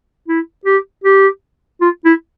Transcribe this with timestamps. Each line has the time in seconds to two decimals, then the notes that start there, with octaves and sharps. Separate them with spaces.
0.28 E4
0.65 G4
1.04 G4
1.81 F4
2.05 E4